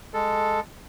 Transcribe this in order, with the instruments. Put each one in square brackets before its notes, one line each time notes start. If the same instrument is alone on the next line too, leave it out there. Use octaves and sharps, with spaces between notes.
[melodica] G#3 A4